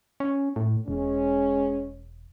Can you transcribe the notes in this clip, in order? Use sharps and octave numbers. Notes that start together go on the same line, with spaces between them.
C#4
A2
E1 G#3 C#4